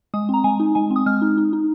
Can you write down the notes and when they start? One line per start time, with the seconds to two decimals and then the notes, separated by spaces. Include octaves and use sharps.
0.14 G#3 D#6
0.29 C4 A#5
0.44 G#3 G#5
0.60 D#4
0.75 G#3 G#5
0.90 C4
0.96 D#6
1.06 G#3 F6
1.22 D#4
1.38 D#4
1.53 D#4